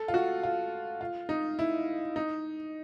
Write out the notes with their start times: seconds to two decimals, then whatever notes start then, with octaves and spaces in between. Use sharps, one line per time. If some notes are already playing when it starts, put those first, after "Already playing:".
Already playing: A4
0.08 F4
0.14 F#4
0.43 F4
1.01 F4
1.29 D#4
1.59 E4
2.16 D#4